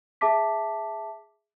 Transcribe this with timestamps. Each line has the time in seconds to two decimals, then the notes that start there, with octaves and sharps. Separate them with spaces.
0.21 G#4 E5 A5 D6 B6